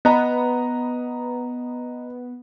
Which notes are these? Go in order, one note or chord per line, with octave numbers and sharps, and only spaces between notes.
B3 D#5 A#5